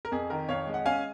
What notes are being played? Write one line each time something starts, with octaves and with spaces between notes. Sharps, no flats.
A#4
F2 G#4
D#3 A#4
F2 C#5 F5
G#3
F#5
C#4 F5 G#5